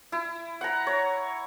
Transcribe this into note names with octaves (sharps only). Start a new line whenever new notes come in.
E4
F#5 A#5
C#5